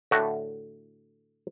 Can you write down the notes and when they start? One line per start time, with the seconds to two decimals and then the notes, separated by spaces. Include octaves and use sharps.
0.11 A2 D3 A3 F#4